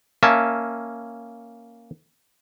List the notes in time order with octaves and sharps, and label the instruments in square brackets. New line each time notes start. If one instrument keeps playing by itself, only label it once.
[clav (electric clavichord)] A#3 C#4 E5 A5